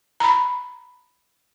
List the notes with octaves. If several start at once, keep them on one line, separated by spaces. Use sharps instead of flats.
A#5 B5